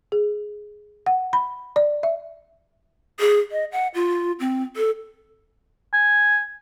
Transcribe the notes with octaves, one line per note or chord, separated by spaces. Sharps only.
G#4
F#5
B5
D5
E5
G#4
D#5
F#5
F4
C4
A4
G#5